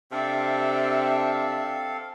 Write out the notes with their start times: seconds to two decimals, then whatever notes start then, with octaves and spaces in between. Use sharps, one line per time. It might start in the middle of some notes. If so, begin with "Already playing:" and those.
0.12 C3 C4 D4 A4 E5 F5